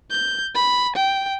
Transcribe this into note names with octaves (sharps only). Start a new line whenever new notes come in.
G6
B5
G5